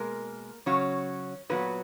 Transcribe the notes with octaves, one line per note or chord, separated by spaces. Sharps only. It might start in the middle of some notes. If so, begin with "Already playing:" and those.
Already playing: B2 G#3 A#3 A#4
C#3 F#3 C#4 C#5
A#2 F#3 B3 B4